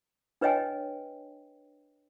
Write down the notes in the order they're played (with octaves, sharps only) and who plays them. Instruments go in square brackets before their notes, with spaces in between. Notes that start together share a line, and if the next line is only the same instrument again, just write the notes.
[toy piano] D4 B4 C#5 D#5 G5 G#5